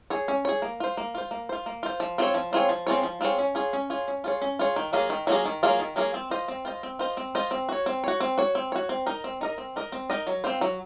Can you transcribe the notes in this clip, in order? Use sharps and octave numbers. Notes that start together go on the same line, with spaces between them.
G#4 C#5
C#4
G#4 C#5
A#3
F4 C5
A#3
F4 C5
A#3
F4 C5
A#3
F4 C5
F3
C4 F4 G#4 C#5
F3
C4 F4 G#4 C#5
F3
C4 F4 G#4 C#5
F3
C4 F4 G#4 C#5
C#4
F4 G#4 C#5
C#4
F4 G#4 C#5
C#4
F4 G#4 C#5
C#4
F4 G#4 C#5
D#3
F#3 A#3 F4 G#4
D#3
F#3 A#3 F4 G#4
D#3
F#3 A#3 F4 G#4
D#3
F#3 A#3 F4 G#4
C4
F4 C5 D#5
C4
F4 C5 D#5
C4
F4 C5 D#5
C4
F4 C5 D#5
C4
F#4 C#5
C4
F#4 C#5
C4
F#4 C#5
C4
F#4 C#5
C4
D#4 A#4 D#5
C4
D#4 A#4 D#5
C4
D#4 A#4 D#5
C4
D#4 A#4 D#5
F#3
C4 F4 C5
F#3